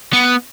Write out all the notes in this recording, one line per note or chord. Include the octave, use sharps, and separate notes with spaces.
B3